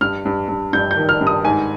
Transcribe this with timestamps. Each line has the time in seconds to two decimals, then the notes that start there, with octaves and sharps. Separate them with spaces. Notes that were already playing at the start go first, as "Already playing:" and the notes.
0.01 G2 F6
0.25 G2
0.48 G2
0.73 G2 G6
0.91 G6
0.97 D#3
1.09 F6
1.21 G2
1.27 D#6
1.45 G#2 G#5